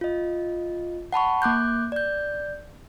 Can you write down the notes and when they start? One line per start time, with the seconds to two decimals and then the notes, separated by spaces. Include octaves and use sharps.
0.01 F4 D#5
1.13 F#5 A5 B5 C#6
1.42 A#3 D6 F#6 G6
1.92 D5 G6